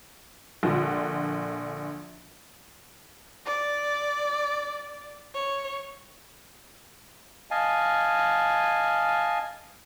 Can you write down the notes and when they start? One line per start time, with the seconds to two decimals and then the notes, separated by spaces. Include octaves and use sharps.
0.63 A#1 D3
3.46 D5
5.34 C#5
7.51 D#5 F5 G#5 A5